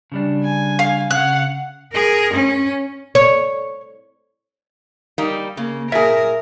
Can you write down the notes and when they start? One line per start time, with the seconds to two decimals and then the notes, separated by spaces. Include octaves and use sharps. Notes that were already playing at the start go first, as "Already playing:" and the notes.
0.12 C#3 G3 D4
0.44 G#5
0.79 F5
1.11 C#3 F5 F#5 F#6
1.93 G#4 A#4
2.34 C#4
3.15 C#5
5.18 G3 A#3 D#4
5.57 C#3 A#3
5.92 A#2 G#4 A#4 E5